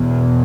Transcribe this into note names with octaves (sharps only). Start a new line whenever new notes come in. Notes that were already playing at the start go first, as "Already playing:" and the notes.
Already playing: E2 B2